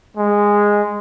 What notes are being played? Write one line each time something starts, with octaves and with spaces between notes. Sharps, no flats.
G#3